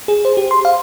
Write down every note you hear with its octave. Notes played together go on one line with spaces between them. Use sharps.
G#4
C5
G4
C6
F5